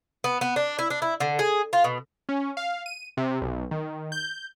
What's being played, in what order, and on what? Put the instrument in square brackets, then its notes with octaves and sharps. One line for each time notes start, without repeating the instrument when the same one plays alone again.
[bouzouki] B3
B3
D4
E4
D4
E4
D3
G#4
F4
B2
[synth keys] C#4
F5
D#7
C3
B1
D#3
G6